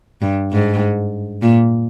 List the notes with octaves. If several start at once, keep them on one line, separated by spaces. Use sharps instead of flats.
G2
G#2
A#2